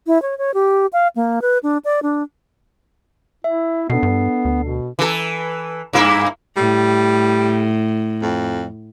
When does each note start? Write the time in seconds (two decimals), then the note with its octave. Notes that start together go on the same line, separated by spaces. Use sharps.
0.07 E4
0.22 C#5
0.38 C#5
0.54 G4
0.93 F5
1.16 A#3
1.42 B4
1.63 D4
1.85 D5
2.03 D4
3.44 E4 E5
3.90 B2 B3 D4 A4 C7
4.03 G2
4.45 D2
4.64 B2
4.99 E3 A4
5.93 G2 A#3 E4
6.57 A2 G3
8.22 F2